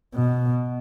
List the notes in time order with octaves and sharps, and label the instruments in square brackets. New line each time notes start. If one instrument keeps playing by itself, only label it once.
[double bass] B2